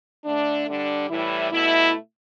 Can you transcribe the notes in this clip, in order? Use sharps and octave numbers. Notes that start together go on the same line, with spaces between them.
D3 A3 D4
D3 G3 D4
A2 E3 G3 E4
B2 A3 E4